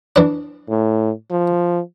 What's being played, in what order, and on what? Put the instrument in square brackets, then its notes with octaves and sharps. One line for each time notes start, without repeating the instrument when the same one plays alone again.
[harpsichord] E3 D4
[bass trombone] A2
F3